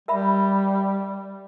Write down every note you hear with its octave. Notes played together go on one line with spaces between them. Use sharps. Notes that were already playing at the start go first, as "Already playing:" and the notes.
G3 A#4 E5 B5